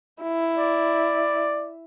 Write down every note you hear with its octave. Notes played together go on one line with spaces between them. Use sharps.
E4
D5